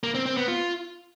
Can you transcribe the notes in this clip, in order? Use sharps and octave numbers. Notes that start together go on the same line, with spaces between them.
A#3
C4
C4
B3
F4